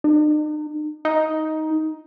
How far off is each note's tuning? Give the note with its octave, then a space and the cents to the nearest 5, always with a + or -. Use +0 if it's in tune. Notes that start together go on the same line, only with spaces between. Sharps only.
D#4 -45
D#4 +10